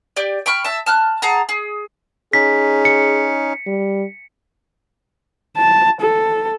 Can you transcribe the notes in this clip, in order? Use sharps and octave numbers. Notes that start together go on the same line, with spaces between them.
G4 D5
G5 B5 C#6 F6
E5 A5
A5 F6 F#6
G#4 F#5 A5 A#5
G#4
C#4 D#4 G#4 B6
C#7
G3
A5
A4